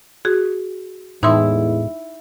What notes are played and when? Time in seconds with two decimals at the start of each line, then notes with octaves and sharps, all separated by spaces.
0.25 F#4 G#4
1.23 E2 A2 E3 G#3 D#4 E4 C6 E6